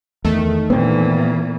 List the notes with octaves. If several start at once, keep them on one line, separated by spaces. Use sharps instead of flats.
E2 D#3 A3
A#2 E3 B3 C4